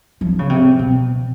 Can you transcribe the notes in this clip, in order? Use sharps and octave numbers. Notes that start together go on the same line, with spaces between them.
F3
C#3
C3
B2